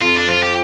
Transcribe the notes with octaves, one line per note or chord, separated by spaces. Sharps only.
F2 F4
D4
F3 F4
G4